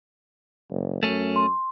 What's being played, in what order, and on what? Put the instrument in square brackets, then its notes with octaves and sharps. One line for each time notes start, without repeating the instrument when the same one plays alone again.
[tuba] F#1
[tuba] F#2 [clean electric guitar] A3 C#4
[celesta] C6